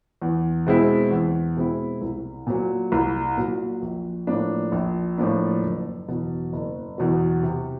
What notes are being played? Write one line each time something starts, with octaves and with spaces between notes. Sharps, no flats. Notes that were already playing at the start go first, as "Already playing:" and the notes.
E2
B2 G#3 C4 E4
E2
B2 G#3 C4 E4
C2
A#2 F#3
C2
A#2 F#3
A#1
A2 F3 A#3 D4
A#1
A2 F3 A#3 D4
F#1
E2 B2 F#3
F#1
E2 B2 F#3
C3